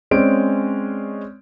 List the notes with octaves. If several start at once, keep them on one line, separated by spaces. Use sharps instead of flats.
G#3 C4 C#4 D5 D7